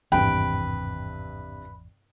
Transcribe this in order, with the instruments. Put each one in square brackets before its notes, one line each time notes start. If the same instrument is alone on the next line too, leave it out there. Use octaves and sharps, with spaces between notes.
[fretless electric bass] G#1 E2 [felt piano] G2 C3 [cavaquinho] B4 [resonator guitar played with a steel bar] G5